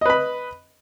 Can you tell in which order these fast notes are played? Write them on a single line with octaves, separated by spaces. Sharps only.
D#5 B4 B5